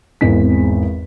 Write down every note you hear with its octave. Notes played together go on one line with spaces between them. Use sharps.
G#1 E2 G#2 C4 B6